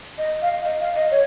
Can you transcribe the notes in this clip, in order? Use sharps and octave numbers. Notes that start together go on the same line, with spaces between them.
D#5
F5
D#5
F5
D#5
C#5